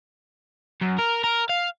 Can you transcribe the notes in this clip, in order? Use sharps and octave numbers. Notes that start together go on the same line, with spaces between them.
F#2
A#4
A#4
F5